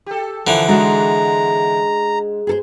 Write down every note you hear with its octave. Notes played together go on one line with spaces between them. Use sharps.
G4 A4
D3 E3 F3 A#4
G#2 G#3 D4 F#4 A#5
G#4 A4 C5